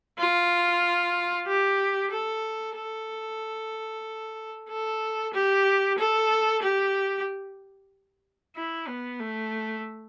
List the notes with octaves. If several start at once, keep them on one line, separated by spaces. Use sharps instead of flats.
F4
G4
A4
A4
A4
G4
A4
G4
E4
B3
A3